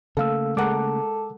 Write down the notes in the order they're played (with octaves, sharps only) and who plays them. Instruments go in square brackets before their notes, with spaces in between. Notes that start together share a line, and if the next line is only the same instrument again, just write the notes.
[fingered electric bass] C#3 A3 A#3 [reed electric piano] A4 F5 E6
[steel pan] G#3 A#4 F#5 [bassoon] A4 [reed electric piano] D6